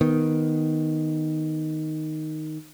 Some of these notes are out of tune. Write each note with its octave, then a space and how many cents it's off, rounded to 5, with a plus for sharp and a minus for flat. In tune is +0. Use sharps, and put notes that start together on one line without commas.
D#3 +0 B3 +0